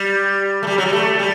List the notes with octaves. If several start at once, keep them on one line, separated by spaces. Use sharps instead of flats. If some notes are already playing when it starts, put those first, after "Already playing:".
Already playing: G3
A3
G3
F#3
G3
A3
A3
G3